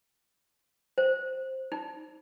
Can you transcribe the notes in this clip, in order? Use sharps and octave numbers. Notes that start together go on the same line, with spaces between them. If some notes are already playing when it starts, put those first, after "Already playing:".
C5
D#4